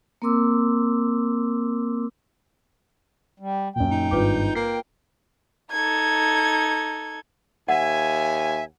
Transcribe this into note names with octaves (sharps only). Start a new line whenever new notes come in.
A#3 C4 A#4 C6 D6 E6
G3
F#2 A#2 G5
D#4
G#1 G2 F4 B4 D6
A#3 C7
D#4 A4 G#6
D#2 E5 F#5 G#5